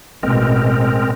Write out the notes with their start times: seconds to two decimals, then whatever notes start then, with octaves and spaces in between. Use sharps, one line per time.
0.23 A1 B2 G#3 C4 A#4